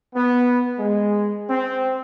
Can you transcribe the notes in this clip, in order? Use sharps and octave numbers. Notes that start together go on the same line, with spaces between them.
B3
G#3
C4